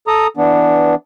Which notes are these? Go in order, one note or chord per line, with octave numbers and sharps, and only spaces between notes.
A4 A#5 D#6
E3 B3 D4